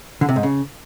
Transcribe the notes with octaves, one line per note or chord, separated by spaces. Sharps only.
D3
C3
G#2
C#3